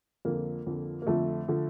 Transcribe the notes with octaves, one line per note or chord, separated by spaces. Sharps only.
F2 D3 F3 A#3
F2 D3 F3
A#3
F2 D3 F3 A3
D3 F3